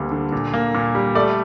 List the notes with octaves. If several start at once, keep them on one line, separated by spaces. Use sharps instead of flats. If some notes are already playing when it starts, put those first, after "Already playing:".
Already playing: D2 G3 A#3
D3
A#2
A#3
A#2
G3
A3 D5